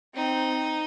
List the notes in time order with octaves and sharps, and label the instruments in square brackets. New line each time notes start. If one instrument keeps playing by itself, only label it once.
[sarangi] C4 [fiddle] D#4